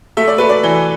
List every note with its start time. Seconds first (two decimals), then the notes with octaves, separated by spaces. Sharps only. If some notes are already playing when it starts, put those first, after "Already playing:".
0.17 A3 E5
0.28 D5
0.38 A3 B4
0.49 D5
0.63 E3